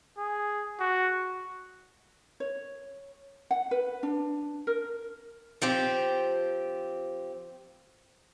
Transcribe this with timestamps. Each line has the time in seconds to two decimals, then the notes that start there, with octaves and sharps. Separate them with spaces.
0.18 G#4
0.80 F#4
2.40 C#5
3.51 F#5
3.71 B4
4.03 D4
4.67 A#4
5.62 F3 C4 G4